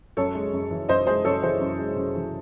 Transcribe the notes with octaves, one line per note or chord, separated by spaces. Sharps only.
F#2 A4 C#5
G#3
F#2
E3
F#2 C5 D#5
G#3 G#4 C5
F#2 A4 C#5
E3 G#4 C5
F#2
G#3
F#2
E3